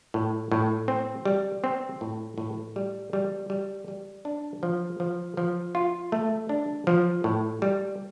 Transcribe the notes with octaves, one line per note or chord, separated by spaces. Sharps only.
A2
A2
C4
G3
C4
A2
A2
G3
G3
G3
G3
D4
F3
F3
F3
F4
A3
D4
F3
A2
G3